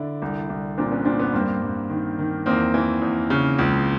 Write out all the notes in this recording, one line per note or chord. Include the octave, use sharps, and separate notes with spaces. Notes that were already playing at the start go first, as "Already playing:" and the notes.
Already playing: D3 D4 E4
C2
C2
A#2 C4 D4
B3 C#4
A#2 C4 D4
B3 C#4
G2 A#3 C4
G2
D#3
D#3
E2 A#3 C4
E3
E2
C#3
C#2